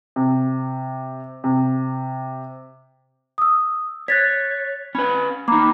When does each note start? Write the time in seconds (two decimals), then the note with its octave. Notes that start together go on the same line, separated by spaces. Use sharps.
0.16 C3
1.44 C3
3.38 D#6 E6
4.08 C#5 F#6 A6 B6
4.95 C#4 B4 B5
5.48 A#3 D#4 A#5 B5 D6